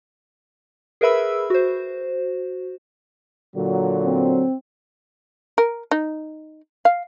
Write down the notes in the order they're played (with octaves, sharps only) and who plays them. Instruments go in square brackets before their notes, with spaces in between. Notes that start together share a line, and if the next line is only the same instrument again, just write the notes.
[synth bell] G#4 A#4 B4 E5 B5 E6
F#4 C5
[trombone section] A#2 D3 F#3
[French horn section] C4
[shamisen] A#4
D#4
F5